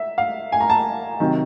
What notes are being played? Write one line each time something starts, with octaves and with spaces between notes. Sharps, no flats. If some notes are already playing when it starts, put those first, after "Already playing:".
Already playing: E5
F5
G#5
A#5
A5
C3 D#3 F#3